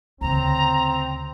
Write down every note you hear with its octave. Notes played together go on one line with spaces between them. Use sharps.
D2 C#3 C4 A#5